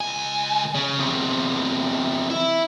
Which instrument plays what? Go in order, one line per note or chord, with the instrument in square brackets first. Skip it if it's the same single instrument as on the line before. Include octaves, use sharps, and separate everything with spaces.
[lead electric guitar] C#2 G#5
C#3
E2 C3
E4